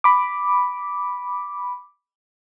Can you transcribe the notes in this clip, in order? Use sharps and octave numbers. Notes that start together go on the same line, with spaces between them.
B5 D6